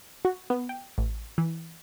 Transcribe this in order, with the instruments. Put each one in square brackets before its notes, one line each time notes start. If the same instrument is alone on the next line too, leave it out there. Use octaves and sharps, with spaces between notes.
[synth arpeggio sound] F#4
B3
G5
A1
E3